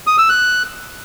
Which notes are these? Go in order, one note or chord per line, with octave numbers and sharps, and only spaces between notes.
D#6
E6
F#6